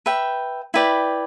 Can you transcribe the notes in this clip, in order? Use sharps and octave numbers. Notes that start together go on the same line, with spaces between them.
B4 E5 G5
E4 B4 D5 G5